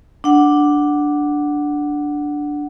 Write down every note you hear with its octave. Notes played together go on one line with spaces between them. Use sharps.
D4 F#5